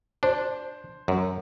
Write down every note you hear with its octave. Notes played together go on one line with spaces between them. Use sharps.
D4 C5
F#2